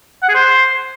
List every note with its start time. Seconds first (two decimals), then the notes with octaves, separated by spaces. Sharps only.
0.23 F#5
0.29 G#4
0.35 C5